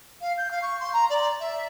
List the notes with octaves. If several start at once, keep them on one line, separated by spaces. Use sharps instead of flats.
F5
G6
F5
C#6
C6
A#5
D5
E5